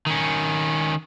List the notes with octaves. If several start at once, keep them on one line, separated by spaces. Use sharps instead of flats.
D#3 C#4